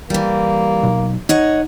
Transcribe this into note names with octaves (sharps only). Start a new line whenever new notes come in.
E3 G3 A#3
B1
D#4 C#5 D#5 F#5